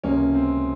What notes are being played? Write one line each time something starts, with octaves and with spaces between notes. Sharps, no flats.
C#2 C3 F3 A#3 C#4
C4